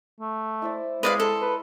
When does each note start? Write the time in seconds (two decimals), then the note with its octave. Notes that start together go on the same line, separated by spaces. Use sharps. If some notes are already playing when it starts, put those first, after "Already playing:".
0.21 A3
0.62 E4 C5 D5
1.03 G#3 B4 D5 F5
1.20 A4 B4 C6
1.42 A#4 B4